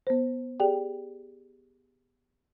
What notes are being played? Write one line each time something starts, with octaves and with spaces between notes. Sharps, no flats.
B3 C5
G4 G#4 D5 G5